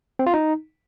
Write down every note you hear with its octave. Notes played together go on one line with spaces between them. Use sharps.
C4
F4
D#4